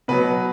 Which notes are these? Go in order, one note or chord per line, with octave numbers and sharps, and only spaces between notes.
B2 F#3 B4